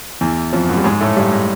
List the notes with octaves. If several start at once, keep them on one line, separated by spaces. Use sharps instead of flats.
E2 E3
F2 F3
F#2 F#3
G3
G#2 G#3
A2 A3
G2 G3
G#3